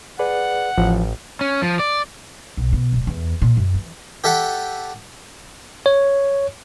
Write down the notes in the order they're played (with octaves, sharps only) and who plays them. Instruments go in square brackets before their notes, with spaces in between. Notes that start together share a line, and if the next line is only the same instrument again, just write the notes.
[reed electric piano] G#4 B4 D5 [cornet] F#5
[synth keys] A1 [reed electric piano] E3 F3
[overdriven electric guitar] C#4
F3
D5
[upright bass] B1
B2
D1
E2
A#2
F#2
E3
[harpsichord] G4 A4 E5 F#5 G5
[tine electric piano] C#5